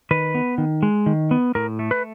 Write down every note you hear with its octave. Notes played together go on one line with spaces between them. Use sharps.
D#3 B4
B3
D#3
G#3
D#3
B3
A2 A#4
A3
B4